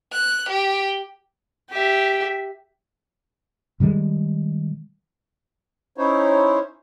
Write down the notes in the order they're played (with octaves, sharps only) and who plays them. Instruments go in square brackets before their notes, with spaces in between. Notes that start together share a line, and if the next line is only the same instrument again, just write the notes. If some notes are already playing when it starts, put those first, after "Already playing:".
[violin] F#6
G4
[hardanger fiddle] G4 E5
[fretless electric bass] B2 D#3 G3 G#3
[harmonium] C#4 D#4 E4 C5 C#5